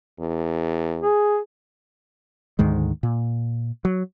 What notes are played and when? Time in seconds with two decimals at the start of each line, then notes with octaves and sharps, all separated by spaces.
0.20 E2
1.01 G#4
2.59 D2 G#2 D#3 G#3
3.03 A#2
3.85 F#3